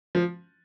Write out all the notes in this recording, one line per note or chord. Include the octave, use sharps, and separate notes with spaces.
F3